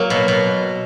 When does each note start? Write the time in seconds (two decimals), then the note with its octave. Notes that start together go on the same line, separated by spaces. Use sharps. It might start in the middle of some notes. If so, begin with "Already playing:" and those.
Already playing: F#3 A#3
0.10 B2
0.28 B2